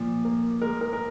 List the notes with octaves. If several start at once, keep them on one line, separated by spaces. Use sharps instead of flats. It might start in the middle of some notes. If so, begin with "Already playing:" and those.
Already playing: A#2 F3
A#3
G#3 A#4
A#4
A#4